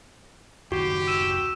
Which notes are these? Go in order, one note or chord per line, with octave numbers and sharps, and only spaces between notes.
F#1 D#2 D#3 F#4 G4 C#6
E6 D#7 E7